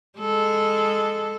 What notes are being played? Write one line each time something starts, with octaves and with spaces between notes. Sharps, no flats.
G#3 A4